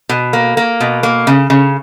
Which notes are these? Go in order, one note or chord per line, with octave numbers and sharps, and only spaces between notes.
B2
A#3
A#3
B2
A#3
C#3
C#3